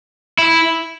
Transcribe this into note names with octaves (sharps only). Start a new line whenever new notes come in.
E4